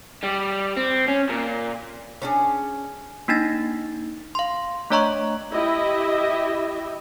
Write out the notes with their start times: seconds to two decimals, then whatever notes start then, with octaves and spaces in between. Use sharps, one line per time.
0.23 G3
0.77 C4
1.08 C#4
1.29 A#2
2.22 C#4 D4 G#4
3.28 A#3 D4 D#4 A6 A#6
4.35 F5 C6
4.90 A3 D4 C#5 D#5 A#5 C#6
5.53 E4 G4 D#5 E5